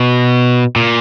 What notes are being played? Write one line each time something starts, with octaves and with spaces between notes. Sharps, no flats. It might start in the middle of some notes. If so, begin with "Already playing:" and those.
Already playing: B2
A#2